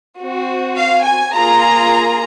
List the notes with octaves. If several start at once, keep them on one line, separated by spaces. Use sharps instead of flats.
C4 F#4
F5
G#5
A#3 F4 G#4 A#5